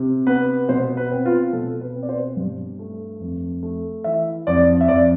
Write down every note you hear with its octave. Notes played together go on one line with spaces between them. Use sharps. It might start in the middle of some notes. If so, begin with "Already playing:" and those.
Already playing: C3
B3 B4
B2 C5
B4
C4
F4
B2 A4
B4
C4
D5
C5
G2
A3
F2
A3
E3 E5
F2 D5
E5
F2 D5